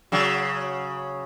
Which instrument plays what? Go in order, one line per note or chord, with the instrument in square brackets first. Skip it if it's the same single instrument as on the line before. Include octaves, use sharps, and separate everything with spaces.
[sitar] C#3 F#3